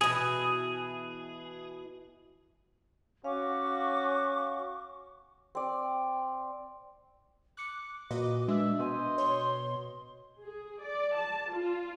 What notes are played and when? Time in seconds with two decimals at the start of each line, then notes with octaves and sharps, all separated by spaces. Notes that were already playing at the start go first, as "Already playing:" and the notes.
0.01 B2 E3 G#4
3.24 C#4 F#4 F5 C#6 D6
5.55 C4 D5
7.57 D6 F#6 C#7
8.11 A#2 F#4 B4 D#5
8.48 G#3 D4 E5
8.79 B2 C5 D#5 G#5
9.18 C#5 C6
10.43 G#4
10.85 D5
11.18 A5
11.53 F4